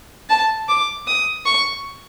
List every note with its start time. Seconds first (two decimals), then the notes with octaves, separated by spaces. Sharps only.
0.30 A5
0.68 D6
1.07 D#6
1.46 C#6